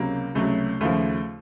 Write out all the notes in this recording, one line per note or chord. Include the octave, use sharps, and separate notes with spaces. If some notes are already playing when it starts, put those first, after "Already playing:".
Already playing: C#2 C3 F#3 A#3
C#2 C3 F#3 A3
D#2 C#3 F3 A3